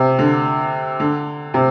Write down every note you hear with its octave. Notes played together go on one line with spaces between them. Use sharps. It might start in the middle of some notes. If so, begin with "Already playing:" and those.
Already playing: C3
D3
D3
C3